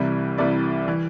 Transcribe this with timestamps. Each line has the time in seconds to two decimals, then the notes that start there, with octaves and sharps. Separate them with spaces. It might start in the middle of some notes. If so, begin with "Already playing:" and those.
Already playing: C2 C3 E3 G3 E4
0.38 C2 C3 E3 G3 E4 D5
0.88 E3